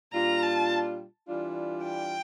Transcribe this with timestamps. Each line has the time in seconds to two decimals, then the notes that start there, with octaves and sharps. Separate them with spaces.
0.13 A#2 G3 D4 F4 A#5
0.43 A5
1.28 E3 G3 D4 F4
1.85 G5